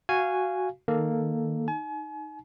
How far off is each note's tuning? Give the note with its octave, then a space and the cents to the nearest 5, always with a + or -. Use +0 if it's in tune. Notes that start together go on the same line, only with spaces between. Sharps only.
F#4 +0 F5 -15 G#5 -5
D#3 +0 A#3 +0 A4 +0
D#4 +0 G#5 +40